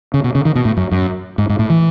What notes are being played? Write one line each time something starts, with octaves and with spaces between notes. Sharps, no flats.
C#3
B2
C#3
D#3
B2
A2
F#2
F#2
G#2
G#2
A2
E3